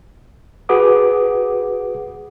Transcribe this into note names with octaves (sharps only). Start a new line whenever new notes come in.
F#4 G#4 B4 F#5 D6 D#6